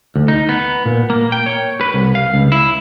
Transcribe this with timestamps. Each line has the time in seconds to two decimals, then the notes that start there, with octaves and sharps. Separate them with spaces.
0.16 D2
0.28 D#4
0.49 B3
0.86 A#2
1.10 A#3
1.32 G5
1.46 C#5
1.81 B4
1.94 C2
2.15 F5
2.34 C#2
2.52 E4